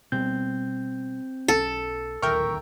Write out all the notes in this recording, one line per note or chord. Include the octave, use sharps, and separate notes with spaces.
B2 G3 B3 C4 G6
B1 C#4 A4
D1 A#1 D#2 A#4 E5 G5 C#6